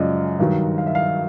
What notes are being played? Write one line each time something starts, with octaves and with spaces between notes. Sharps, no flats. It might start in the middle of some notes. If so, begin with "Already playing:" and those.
Already playing: F#2 C#3 F3 G#3 D5 D#5
G2 D#3 F#3
F5
E5
F5